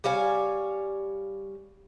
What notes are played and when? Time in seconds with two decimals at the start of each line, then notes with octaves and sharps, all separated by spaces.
0.04 G3 C#5 F5 G#5